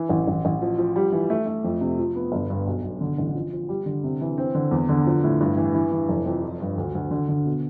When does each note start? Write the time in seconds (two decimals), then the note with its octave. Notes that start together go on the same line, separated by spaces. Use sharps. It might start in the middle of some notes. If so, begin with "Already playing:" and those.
Already playing: E3
0.09 A1
0.28 A1
0.45 A1
0.62 F3
0.78 F3
0.96 G3
1.12 E3
1.30 A3
1.46 A3
1.64 F2
1.81 C3
1.98 F3
2.16 B3
2.32 G1
2.50 G2
2.67 B1
2.84 B1
3.01 D3
3.18 A1
3.35 F3
3.53 F3
3.69 G3
3.86 D3
4.04 C3
4.21 E3
4.38 C4
4.55 D3
4.71 E2
4.89 D3
5.06 F3
5.24 A2
5.40 G2
5.57 E3
5.74 E3
5.92 E3
6.08 F1
6.26 F2
6.42 F3
6.60 G2
6.77 D2
6.95 D2
7.11 D3
7.29 D3
7.46 B2